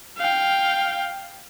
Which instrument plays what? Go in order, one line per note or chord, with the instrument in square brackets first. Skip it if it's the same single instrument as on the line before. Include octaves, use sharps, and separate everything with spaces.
[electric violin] F5 G5